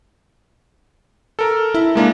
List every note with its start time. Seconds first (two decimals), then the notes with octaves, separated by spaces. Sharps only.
1.39 A4 A#4
1.75 E4
1.95 G#3 A#3 D4